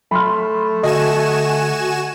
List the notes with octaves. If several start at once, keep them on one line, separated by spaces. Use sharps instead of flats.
F#3 A3 B5 C6 F6
D3 F#4 D#5 G#5 E7